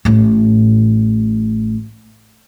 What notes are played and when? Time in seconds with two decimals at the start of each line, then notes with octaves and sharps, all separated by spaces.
0.05 A1 A2